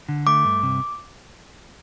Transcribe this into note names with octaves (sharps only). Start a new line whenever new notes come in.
D3
A3 D6
G2
C3